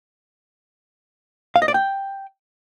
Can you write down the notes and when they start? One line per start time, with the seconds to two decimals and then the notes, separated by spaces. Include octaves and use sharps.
1.56 F5
1.62 D#5
1.68 D5
1.74 G5